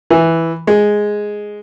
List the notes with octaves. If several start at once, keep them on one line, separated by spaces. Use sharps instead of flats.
E3
G#3